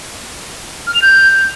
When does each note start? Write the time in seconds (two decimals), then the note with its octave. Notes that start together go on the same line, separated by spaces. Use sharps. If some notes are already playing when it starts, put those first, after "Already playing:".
0.87 F6
0.94 F7
1.02 G6